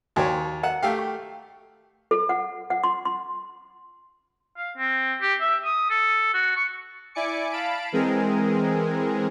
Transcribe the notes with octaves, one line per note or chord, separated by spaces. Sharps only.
D#2 F#4 C#5 G5 G#5
A#4 D#5 F#5 A#5
A3 G4 F5 G5
C#6
A4
F#5
F#5
C6
C6
F5
C4
G4
E5
D#6
A4
F#4
C#6
E4 D5 G#5 D6 C#7
F5 A5 B5 D7
E3 G#3 C4 G#4 A#4